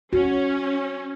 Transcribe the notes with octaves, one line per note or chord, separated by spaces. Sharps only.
C#4 F#4